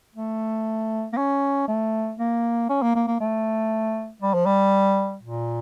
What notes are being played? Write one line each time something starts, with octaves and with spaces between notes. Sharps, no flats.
A3
A#3
C#4
A3
A#3
C#4
A#3
A#3
A#3
A3
G3
F3
G3
A#2